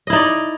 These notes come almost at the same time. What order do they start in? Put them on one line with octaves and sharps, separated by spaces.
D#5 E4 D#4 D5